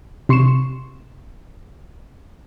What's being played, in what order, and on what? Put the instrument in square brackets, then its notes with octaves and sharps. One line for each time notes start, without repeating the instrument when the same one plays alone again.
[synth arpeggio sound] C3 C6 C#6 C#7 E7